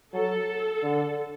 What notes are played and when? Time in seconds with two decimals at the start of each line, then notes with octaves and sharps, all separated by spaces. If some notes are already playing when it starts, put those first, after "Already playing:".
0.14 F#3 A4
0.83 D3